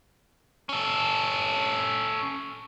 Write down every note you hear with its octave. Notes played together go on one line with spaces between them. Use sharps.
C#4 A4